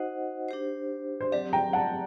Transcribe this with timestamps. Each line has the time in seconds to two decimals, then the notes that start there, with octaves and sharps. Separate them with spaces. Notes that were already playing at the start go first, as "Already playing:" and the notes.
Already playing: D#4 F#4 C5 D#5 F#5
0.49 D4 G4 C5
1.21 C5
1.32 F#3 C4 G4 D5
1.53 G5 A#5
1.73 F#5 A5